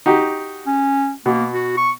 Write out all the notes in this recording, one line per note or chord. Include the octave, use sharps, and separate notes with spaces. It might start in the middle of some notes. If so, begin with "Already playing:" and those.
D#4 F#4 G4
C#4
B2 A#3
F#4
C#6